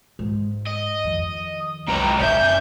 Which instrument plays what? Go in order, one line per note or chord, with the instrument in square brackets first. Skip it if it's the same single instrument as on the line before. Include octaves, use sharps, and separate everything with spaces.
[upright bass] G#2
[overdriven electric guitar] D#5
[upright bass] F2 D#3
[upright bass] C2 [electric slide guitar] F#2 B4 C#5 [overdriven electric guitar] G#3 G5 [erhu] A#5
[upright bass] F#1 C3 [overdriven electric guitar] C#4 D4 [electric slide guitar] D5 E5 [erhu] G6